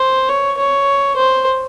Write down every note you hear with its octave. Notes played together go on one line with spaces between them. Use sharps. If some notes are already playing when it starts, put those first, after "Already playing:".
Already playing: C5
C#5
C#5
C5